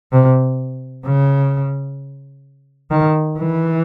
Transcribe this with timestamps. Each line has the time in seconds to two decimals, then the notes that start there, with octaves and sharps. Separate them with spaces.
0.12 C3
1.05 C#3
2.91 D#3
3.38 E3